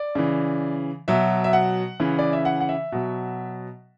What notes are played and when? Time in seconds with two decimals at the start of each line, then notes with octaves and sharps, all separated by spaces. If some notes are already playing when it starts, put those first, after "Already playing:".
Already playing: D5
0.15 C#3 E3
1.08 B2 F#3 E5
1.44 E5
1.53 F#5
2.00 C#3 E3
2.19 D5
2.33 E5
2.45 F#5
2.60 F#5
2.69 E5
2.92 B2 F#3